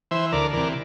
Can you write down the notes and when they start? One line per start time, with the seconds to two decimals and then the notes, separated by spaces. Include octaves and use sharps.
0.11 E3 C5 E5
0.32 D2 A#4 D5
0.53 C3 E3 A#4 D5